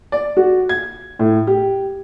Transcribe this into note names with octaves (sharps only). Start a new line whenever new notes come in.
D5
F#4
G#6
A2
G4